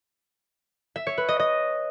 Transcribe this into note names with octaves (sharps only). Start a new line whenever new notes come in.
E5
C#5
B4
D#5
D#5